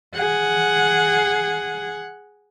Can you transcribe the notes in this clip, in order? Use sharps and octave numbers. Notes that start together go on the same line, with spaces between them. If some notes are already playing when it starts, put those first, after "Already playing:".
G#4 F#5